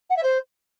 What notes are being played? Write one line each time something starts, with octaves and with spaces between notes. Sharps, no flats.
F#5
E5
C5